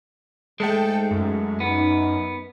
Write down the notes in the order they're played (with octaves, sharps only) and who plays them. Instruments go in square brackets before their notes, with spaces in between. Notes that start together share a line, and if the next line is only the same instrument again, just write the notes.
[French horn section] G#2 G#4 [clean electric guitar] G#3 A3 [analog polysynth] A4 G5
[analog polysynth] F#2
[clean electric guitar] B3 [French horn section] D#4